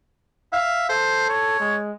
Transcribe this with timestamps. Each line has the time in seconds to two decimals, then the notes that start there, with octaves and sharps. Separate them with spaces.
0.53 E5 F5
0.89 A4 C5
1.29 C#5
1.60 G#3